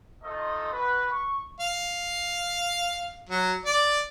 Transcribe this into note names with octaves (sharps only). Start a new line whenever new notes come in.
A3 D#4 F4 A4 C5 D#5
F#4 B4
C#6
F5
F#3
D5